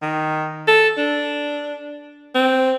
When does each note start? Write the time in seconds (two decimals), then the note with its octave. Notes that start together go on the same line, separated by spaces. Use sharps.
0.02 D#3
0.68 A4
0.97 D4
2.35 C4